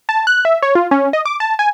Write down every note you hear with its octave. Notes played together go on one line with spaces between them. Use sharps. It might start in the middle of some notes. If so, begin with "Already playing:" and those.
A5
F#6
E5
C#5
F4
C#4
D#5
D6
A5
G#5